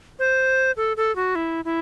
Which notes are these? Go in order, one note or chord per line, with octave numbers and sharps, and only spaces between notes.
C5
A4
A4
F#4
E4
E4